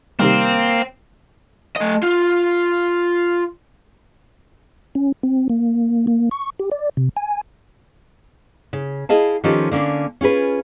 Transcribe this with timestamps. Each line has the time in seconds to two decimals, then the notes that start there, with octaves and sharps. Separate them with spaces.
0.19 C3 D#3 G3 A#3 C4 F5
1.76 A3 D#5
2.03 F4
4.95 C#4
5.23 C4
5.50 A#3
6.07 A#3
6.31 C#6
6.59 G4
6.71 D5
6.97 C3
7.16 G#5
8.73 C#3
9.09 E4 G#4 D#5 F5 A5
9.44 D#3 F3 C#4 F4 G4 A4
9.71 D3 A#3 C#4 D4
10.21 C#4 F4 G#4 B4